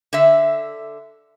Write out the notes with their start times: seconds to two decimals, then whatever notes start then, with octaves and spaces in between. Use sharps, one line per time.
0.13 D3 E5